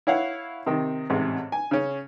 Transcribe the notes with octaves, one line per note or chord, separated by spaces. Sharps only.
E4 C#5 F5 F#5
C3 D#3
A1 G#2 C3
G#5
C#3 C#4